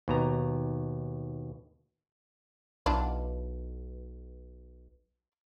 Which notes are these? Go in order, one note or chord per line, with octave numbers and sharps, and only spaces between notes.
D#2 B2 A#5
B1 D4 E4 F4